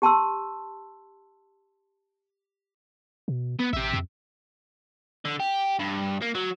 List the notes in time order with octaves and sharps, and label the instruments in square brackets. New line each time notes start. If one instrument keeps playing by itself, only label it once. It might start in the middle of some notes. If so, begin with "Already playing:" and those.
[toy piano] G4 A5 C6 E6
[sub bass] B2
[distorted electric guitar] B3
[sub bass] A1 [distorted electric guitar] G4 E5
[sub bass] F2
[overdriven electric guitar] D3
G4
G2
A#3
F#3